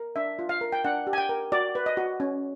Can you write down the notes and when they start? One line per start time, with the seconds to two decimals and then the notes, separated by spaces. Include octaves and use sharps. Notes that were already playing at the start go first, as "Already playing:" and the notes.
Already playing: A#4
0.16 D4 E5
0.39 F4
0.49 F5
0.61 A#4
0.72 G5
0.84 D4 F#5
1.07 G4
1.13 G#5
1.18 G5
1.29 A#4
1.52 F#4 D5
1.75 B4
1.86 D#5
1.97 F#4
2.20 C#4